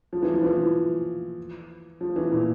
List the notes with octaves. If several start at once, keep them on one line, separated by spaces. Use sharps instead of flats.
F3
E3
F3
E3
F3
E3
A#2